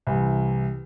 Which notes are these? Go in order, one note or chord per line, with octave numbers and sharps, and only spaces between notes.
C2 E3